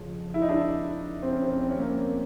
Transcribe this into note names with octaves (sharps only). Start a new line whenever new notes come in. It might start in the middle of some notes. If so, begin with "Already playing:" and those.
Already playing: F2 C#3 F3
E4
D#4
D4 E4
C4
C#4
C4
C#4
C4
C#4
A#3 C4